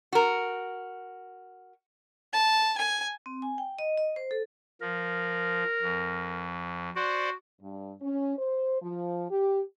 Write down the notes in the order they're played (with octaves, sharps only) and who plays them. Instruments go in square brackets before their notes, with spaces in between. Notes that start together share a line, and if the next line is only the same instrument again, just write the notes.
[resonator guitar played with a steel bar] F#4 A#4
[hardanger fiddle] A5
G#5
[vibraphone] C4
G#5
G5
D#5
D#5
C5
A4
[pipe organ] F3 [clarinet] A#4
[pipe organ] F2
[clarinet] F#4 [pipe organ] C5 D5 F#5
[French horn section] G2
C#4
C5
F3
G4